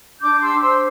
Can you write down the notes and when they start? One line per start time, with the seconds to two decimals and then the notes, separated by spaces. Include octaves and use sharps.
0.20 D4 D6 G6
0.40 G4 C6 E6
0.61 C5 C6 E6